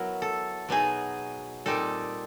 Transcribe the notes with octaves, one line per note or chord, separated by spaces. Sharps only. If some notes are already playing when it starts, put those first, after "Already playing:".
Already playing: F#3 B3 E4 A#4
A4
B2 F#3 B3 D#4 G#4
A#2 G3 C4 D#4 A4